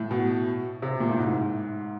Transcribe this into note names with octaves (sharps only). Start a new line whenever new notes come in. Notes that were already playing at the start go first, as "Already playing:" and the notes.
Already playing: A2
B2
C3
A#2
A2
G#2